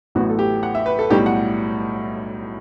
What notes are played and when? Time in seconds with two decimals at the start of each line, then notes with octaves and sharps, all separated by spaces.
0.15 A1 A2 F#3 B3 F#4
0.30 A4
0.39 G4
0.63 F#5
0.75 E5
0.86 B4
0.99 A4
1.10 B1 A2 G3 G4
1.26 F#5